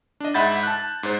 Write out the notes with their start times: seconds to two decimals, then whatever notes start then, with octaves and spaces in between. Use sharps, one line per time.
0.20 D4 D#5
0.34 G#2 E5 F#5 B5 G6 A6
0.63 A5 F#6
1.03 G#2 C5